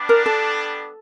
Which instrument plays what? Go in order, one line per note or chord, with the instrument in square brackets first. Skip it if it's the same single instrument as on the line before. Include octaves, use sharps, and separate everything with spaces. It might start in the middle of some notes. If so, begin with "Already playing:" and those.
Already playing: [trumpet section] G3 B3 D4
[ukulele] A#4
A4